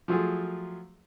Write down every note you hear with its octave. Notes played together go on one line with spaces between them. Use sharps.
F3 F#3 A3 F4 G#4